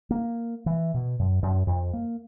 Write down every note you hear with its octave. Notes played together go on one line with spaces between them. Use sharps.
A#3
E3
B2
F#2
F#2
F2
A#3